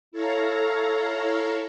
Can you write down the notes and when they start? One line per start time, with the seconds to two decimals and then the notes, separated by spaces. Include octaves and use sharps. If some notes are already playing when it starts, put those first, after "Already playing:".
0.12 E4 A4 C#5 F5 A#5